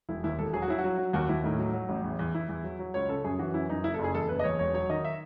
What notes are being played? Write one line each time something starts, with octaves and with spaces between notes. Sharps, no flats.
E1 E4
D#2 E4
E1 A4
F#3 G#4
F#4
F#3 E4
F#4
F#3
F#3
D#2 F#4
D#2 E4
A2 D#4
F#3
F#3
A1
E2
E2
E2 E4
E2
F#3
F#3
C#2 C#5
C#3 A4
F#2 G#4
E3 F#4
F#2 E4
F#2 D#4
F#1 E4
A4
F#1
G#4
E2 A4
F#1 B4
D#5
E2 C#5
E1 C#5
F#3 C#5
D#3 D#5
E5